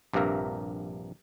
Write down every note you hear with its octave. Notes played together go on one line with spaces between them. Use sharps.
A#1 G2 C3 A#3 A#4 E5